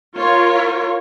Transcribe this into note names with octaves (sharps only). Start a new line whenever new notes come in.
F4 A#4 C#5